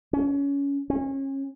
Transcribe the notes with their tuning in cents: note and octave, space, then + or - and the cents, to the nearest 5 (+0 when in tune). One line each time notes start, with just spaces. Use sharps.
C#4 +20
C#4 -30